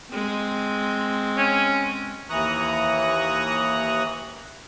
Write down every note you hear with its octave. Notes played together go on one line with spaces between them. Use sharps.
G#3 C4
C#4
D#2 E3 A#5 C#6 D#6 F#6